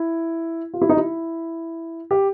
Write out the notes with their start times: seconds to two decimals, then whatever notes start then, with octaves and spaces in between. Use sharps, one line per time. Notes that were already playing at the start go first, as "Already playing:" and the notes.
Already playing: E4
0.74 F4
0.82 E4
0.89 D#4
0.97 E4
2.11 G4